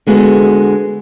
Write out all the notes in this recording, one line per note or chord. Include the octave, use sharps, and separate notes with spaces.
D3 G#3 B3 F#4 A4